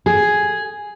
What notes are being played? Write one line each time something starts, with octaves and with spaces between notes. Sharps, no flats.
G#4